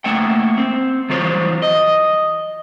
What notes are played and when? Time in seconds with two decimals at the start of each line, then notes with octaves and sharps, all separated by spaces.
0.04 A3 A#3 E5 F#5 G5
0.58 C4
1.09 E3 F#3 G3 F4 C5 C#5
1.62 D#5